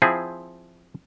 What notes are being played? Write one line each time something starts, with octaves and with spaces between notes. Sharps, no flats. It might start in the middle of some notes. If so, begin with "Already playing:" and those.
F3 C4 E4 G#4 C5